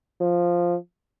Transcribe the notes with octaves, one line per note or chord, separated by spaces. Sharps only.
F3